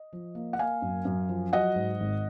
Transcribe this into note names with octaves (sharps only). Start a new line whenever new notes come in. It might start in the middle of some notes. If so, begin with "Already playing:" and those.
Already playing: D#5
F3
A#3
F#5
A#3 F5 G#5
F#2
F#2
F3
F#3 D#5 F#5
G#2
G#1